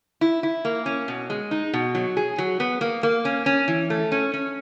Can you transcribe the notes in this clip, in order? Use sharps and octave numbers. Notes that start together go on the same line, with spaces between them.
E4
E4
A#3
C#4
B2
G#3
D#4
B2
F#3
G#4
F#3
B3
A#3
A#3
C#4
C#4
E3
A3
C#4
C#4